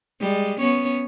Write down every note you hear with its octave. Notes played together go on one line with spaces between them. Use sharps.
G3 G#3
B3 C#4 C#5